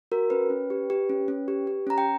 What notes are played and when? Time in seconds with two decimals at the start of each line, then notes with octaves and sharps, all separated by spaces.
0.12 F#4 A#4
0.30 C#4 B4
0.50 C#4
0.70 G4
0.90 G4
1.09 C#4
1.28 C#4
1.48 G4
1.67 G4
1.87 C#4 A#5
1.98 G5